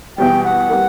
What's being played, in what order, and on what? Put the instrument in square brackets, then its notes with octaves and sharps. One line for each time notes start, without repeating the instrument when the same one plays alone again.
[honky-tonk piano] E2 B2 G3 [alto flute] G5
[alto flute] F#5
[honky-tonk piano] E3 G3 A#3